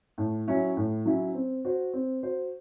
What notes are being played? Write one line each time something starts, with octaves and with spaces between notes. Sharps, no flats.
A2
F#3 C#4 E4
A2
F#3 C#4 E4
C4
F#4 C5
C4
F#4 C5